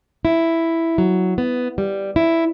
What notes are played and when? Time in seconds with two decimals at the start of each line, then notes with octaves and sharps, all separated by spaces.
0.25 E4
0.98 F#3
1.38 B3
1.78 G3
2.16 E4